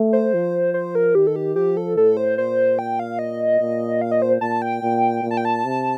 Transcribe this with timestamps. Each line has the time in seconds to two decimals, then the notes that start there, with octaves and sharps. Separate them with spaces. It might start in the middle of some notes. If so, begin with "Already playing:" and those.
Already playing: A3
0.13 C5
0.34 F3
0.74 C5
0.95 A#4
1.15 D#3 G4
1.27 A4
1.36 G4
1.56 F3 G4
1.77 A4
1.97 A2 A4
2.17 C5
2.37 A#2 C5
2.79 G5
2.99 F5
3.19 D#5
3.61 A#2
4.01 F5
4.11 D#5
4.22 C5
4.41 A#2 A5
4.62 G5
4.82 A#2
5.23 A#2
5.31 A5
5.37 G5
5.45 A5
5.65 C3